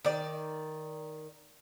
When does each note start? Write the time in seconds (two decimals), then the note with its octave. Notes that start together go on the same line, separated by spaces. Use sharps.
0.05 D#3 D5